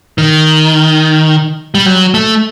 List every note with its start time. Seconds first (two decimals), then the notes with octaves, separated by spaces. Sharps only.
0.18 D#3
1.75 G3
1.86 F#3
2.14 A3